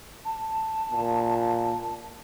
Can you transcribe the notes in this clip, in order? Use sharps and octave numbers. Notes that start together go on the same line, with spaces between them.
A5
A#2